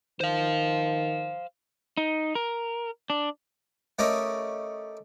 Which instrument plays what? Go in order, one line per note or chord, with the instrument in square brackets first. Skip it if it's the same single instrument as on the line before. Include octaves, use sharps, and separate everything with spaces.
[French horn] D#3 [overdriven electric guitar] C5 F5
[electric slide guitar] D#4
A#4
D4
[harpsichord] A3 C#4 G4 A#4 C#5 D#5